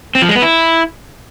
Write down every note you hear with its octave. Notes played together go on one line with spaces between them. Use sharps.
C4
F3
G#3
B3
E4